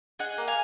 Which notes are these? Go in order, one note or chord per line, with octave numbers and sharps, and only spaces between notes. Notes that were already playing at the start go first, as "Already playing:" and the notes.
G#4 D#5 F#5
A#3
F5 G#5